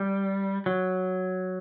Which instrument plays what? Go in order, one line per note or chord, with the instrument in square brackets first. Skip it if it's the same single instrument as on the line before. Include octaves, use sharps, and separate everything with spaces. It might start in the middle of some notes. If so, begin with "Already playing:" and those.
Already playing: [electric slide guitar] G3
F#3